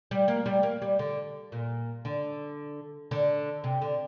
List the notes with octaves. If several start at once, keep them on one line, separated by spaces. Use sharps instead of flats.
G3
A#3
G3
A#3
G3
D3
A#2
D3
D3
C3
D3